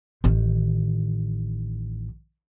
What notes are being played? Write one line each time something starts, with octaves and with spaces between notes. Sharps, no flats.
A1 D#3